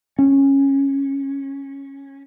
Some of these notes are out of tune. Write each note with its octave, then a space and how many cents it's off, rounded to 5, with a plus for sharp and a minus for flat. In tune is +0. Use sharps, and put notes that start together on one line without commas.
C#4 -10